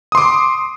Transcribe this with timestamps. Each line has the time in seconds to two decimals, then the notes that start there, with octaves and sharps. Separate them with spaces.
0.12 D#6
0.15 C6
0.17 D6